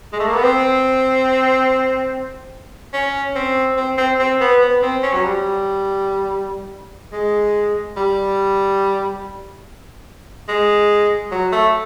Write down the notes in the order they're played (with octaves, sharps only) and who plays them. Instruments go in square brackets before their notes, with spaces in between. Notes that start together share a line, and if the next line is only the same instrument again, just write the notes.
[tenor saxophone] G#3
A3
A#3
B3
C4
C#4
C4
C4
C4
C4
B3
B3
C4
C#4
F#3
G3
G#3
G3
G#3
F#3
A3